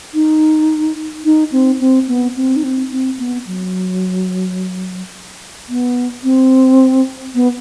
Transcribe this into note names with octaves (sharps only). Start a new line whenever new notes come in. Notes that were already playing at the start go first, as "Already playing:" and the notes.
D#4
D#4
C4
C4
B3
C4
D#4
C4
C4
B3
F#3
B3
C4
B3